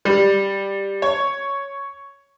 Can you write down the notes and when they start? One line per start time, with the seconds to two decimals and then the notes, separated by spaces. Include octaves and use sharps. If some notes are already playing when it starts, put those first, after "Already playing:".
0.05 G3
1.02 C#5